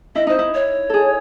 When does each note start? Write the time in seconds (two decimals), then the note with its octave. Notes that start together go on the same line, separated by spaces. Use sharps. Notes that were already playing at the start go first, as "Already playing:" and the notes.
0.15 E4 D#5
0.27 D#4 C5
0.39 E4
0.54 C#5
0.90 G#4 A4